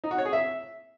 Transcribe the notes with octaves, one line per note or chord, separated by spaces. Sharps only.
D#4
F#4
C#5
G#4
E5